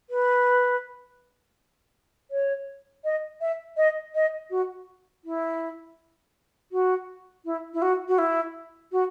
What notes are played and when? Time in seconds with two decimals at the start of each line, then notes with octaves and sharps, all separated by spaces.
0.10 B4
2.31 C#5
3.04 D#5
3.41 E5
3.77 D#5
4.15 D#5
4.50 F#4
5.24 E4
6.72 F#4
7.45 E4
7.74 E4
7.82 F#4
8.08 F#4
8.18 E4
8.92 F#4